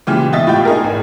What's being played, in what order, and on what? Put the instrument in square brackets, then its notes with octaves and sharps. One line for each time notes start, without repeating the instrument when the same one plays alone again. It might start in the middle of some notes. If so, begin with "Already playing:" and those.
[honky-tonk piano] A#2 C#3 E3 G4
B2 D#5 E5 A6
A2 E4 F4 G4 G5
D#4 G#4 A#4
G#1